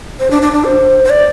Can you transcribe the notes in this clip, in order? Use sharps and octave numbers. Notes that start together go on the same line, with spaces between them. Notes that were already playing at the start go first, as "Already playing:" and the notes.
C5
D4
D4
D4
C5
C5
D5